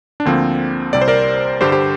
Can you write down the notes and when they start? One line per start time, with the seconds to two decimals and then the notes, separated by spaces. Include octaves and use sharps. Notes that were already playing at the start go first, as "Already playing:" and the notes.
0.20 D4
0.25 D2 D3 F3 A#3 C4
0.93 C2 C3 G3 D5
1.01 C5
1.08 A#4 D5
1.61 G2 D3 G3 G4 C5
1.72 G4 C5